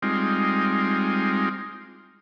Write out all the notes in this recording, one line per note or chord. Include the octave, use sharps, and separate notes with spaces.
G3 G#3 C4 D#4 F4